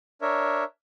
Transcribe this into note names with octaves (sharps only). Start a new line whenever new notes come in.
D4 A#4 C#5 E5